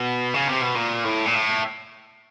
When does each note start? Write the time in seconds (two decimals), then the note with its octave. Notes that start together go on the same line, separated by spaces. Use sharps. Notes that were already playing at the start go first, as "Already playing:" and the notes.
Already playing: B2
0.34 C#3
0.49 C3
0.62 B2
0.75 A#2
1.04 A2
1.25 A#2
1.34 A2